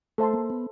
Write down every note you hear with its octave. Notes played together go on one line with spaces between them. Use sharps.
A3 A4 C5 E5 A5 C6
A#3
B3